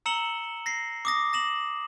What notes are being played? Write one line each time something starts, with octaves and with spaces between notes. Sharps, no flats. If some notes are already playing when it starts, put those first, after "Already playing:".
A#5 E6 C#7 E7 F#7 G7
A#6 C7
D6 D#6 A#6
A#6 E7 F#7